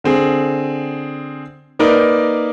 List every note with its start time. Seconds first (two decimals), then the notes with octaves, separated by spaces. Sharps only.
0.04 D3 C4 G#4
1.79 A#3 D#4 A#4 B4 D5